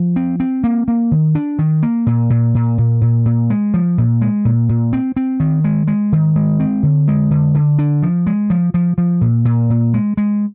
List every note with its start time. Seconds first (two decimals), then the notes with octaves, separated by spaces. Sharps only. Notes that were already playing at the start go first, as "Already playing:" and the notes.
Already playing: F3
0.16 C4
0.40 C4
0.64 A#3
0.88 A#3
1.11 D#3
1.35 D4
1.59 D#3
1.83 A#3
2.07 A#2
2.30 A#2
2.55 A#2
2.78 A#2
3.02 A#2
3.26 A#2
3.50 G#3
3.74 F3
3.98 A#2
4.21 G#3
4.45 A#2
4.69 A#2
4.93 C4
5.16 C4
5.40 D#3
5.64 G#3
5.88 G#3
6.12 D#3
6.36 G#3
6.60 C4
6.83 D3
7.08 G#3
7.30 D3
7.54 D3
7.79 D4
8.03 F3
8.27 G#3
8.50 F3
8.74 F3
8.98 F3
9.21 A#2
9.45 A#2
9.70 A#2
9.94 G#3
10.17 G#3